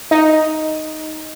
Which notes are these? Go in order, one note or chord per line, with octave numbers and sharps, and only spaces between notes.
D#4